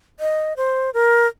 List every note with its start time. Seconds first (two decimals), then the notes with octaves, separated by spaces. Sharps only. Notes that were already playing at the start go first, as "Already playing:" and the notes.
0.20 D#5
0.57 C5
0.94 A#4